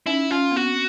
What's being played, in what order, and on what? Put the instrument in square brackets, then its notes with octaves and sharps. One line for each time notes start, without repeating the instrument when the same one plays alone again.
[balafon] C#4 D#4 [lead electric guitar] E4
[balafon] C#4 [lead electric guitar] F4
[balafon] B3
[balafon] C4 [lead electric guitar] F#4